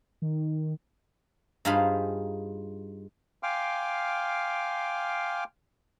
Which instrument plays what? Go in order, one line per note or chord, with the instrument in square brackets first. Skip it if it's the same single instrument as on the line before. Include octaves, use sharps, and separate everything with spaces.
[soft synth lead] D#3
[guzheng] G2 D#4 F4 G#4 C5 B5
[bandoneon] F5 G5 G#5 C6 D6 F6